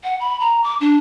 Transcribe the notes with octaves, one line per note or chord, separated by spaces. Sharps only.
F#5
B5
A#5
D6
D4